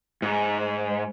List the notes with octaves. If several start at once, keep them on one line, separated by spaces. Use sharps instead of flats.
G#2